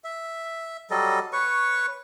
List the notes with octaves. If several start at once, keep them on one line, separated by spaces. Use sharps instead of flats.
E5
F#3 G3 A4 D#5
B4 C#5 C#6